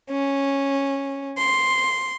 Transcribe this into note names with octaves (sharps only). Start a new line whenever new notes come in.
C#4
C6